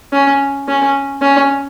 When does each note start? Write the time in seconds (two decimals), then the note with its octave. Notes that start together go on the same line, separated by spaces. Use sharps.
0.13 C#4
0.68 C#4
1.22 C#4